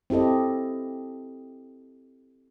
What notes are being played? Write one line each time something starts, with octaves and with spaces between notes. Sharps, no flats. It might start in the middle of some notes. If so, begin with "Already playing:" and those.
C4 E4 G4 A4 D#5